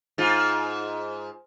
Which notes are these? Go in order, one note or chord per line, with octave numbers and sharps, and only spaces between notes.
G#2 F4